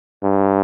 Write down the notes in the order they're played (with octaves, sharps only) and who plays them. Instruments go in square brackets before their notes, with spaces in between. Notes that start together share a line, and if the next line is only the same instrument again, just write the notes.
[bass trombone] G2